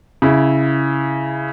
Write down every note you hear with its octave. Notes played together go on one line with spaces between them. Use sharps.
C#3 E4